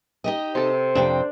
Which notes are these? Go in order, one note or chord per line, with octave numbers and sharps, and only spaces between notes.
D#4 G4 D#5
C3 A4 C5
F2 C3 C4 D4